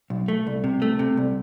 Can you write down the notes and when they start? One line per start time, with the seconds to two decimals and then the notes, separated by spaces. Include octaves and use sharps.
0.10 B1
0.28 A3
0.47 C2
0.64 C3
0.82 A3
0.99 C3
1.17 C2